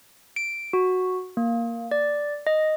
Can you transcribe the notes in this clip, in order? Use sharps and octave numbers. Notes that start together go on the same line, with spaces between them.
D7
F#4
A#3
D5
D#5